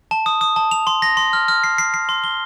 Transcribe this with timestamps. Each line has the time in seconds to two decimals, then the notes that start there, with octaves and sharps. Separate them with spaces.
0.11 A5
0.26 D#6
0.41 D#6
0.56 A5
0.71 F7
0.87 C6
1.02 A#6
1.17 C6
1.33 F6
1.48 F6
1.64 C7
1.78 C7
1.94 C7
2.09 C6
2.24 G7